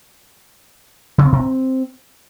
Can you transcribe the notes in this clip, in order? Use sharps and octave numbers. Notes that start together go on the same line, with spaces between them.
C#3
C4
C3
C4